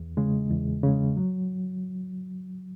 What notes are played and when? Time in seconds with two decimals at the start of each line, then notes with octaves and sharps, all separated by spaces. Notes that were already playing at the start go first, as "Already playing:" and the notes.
Already playing: E2
0.17 C#3 G#3
0.50 E2
0.83 C#3 G#3
1.17 F#3